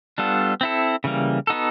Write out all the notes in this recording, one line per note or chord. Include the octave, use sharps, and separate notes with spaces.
G3 B3 D4 F4 A4
C4 E4 A4
C#3 E3 G3 A#3
B3 D#4 F#4 A4